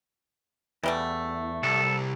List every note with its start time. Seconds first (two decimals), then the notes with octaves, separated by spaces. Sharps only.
0.83 E2 E3 G3 A3
1.63 C2 A4